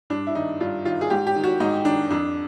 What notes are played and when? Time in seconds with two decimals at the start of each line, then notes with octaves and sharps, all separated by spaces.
0.10 G2 D4
0.27 E4
0.35 D#3 D#4
0.60 G2 F4
0.85 D#3 F4
1.01 G#4
1.10 G#2 G4
1.27 G4
1.36 D#3
1.44 F#4
1.60 G#2 D#4
1.85 D#3 D4
2.11 F2 D4